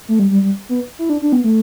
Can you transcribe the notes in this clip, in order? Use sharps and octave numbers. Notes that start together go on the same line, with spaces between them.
A3
G3
G3
G3
B3
E4
D4
D4
B3
A3